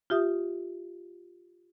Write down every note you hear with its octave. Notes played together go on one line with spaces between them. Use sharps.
F4 G4 E5 D#6